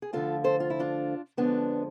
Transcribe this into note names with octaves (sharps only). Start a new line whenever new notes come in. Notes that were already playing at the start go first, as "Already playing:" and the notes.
G#4
D2 D3 F3 F4 A4
A4 C5
F4
E4
D4 F4
F2 D3 F3 G#3 B3 D4